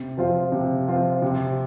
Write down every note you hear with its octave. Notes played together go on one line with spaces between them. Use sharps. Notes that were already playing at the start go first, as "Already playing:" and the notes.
Already playing: C3
F3 C4 F4
C3
F3 C4 F4
C3